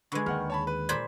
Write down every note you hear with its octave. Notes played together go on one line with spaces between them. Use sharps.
D3 G#3 B4 B5 C#6
D#2 D#3 G#4 F#5 F6
C#5 A5 B5
B4
A#2 C5 D5 B5 G#6